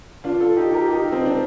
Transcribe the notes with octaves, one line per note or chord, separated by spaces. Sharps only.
D4 F4
F4 A4
D#4 G4
G4 A#4
D#4 G4
C4 D#4
D4